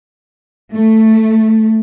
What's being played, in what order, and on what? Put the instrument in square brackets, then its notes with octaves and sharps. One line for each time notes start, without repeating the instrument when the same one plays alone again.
[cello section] A3